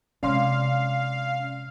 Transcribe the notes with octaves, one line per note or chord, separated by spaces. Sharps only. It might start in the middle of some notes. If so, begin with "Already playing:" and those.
C3 G#3 C#4 D5 F5 C6